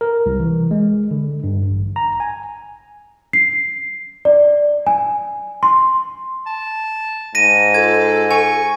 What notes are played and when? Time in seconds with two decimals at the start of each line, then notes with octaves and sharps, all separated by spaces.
0.01 A#4
0.26 C2
0.40 E3
0.71 G#3
1.11 D3
1.44 G2
1.71 A1
1.96 A#5
2.20 G#5
3.33 C7
4.25 D5
4.87 G#5
5.63 C6
6.46 A5
7.35 G#2 A#6 D#7
7.74 F4 A4 G#6
8.31 G#5 C#6